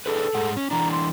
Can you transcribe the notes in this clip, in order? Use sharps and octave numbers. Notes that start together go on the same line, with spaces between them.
D4 G#4 A4 B4
G#2 G#4 F#5
C#4
E3 D4 A#5
C6